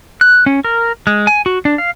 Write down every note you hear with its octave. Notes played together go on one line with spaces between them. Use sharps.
F#6
C#4
A#4
G#3
G#5
F#4
D4
F5